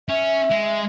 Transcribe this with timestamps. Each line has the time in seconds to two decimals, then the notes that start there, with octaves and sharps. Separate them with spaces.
0.09 C#4 E5
0.51 G#3